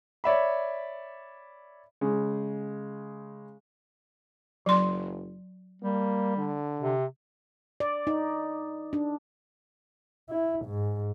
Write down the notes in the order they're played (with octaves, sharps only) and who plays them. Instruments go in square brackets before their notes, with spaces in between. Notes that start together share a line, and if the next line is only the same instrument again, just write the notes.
[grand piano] C#5 D5 E5 B5
[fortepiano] C#3 G#3
[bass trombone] F#1 [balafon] F#3 C6
[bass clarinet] G3 [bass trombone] A#3
[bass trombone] D3
[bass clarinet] C3
[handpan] D5
D#4
D4
[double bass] E4
G#2